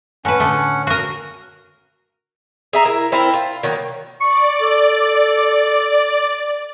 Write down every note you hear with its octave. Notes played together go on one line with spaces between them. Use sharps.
A2 C#4 B4 F#5
D3 A3
F#4 A#4
G#4 E5 A#5
E4 A#4
C4 E4 A4 A#4
F4
D#3 F#3 A#3
D5 C#6
A4